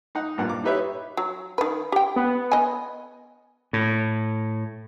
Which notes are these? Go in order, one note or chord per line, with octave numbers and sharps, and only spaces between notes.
D#4 F#5
C2 G2 A#2 F#5
D6
D#4 E4 G4 B4 C#5 E5
F#3
D#3 B4
G4 G5
B3
D#5 G#5
A2